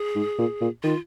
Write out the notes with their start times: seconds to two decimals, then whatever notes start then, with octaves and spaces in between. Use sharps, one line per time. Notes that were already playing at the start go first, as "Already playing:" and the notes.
Already playing: G#4
0.15 G#2
0.38 A#2
0.61 A#2
0.83 D#3 F4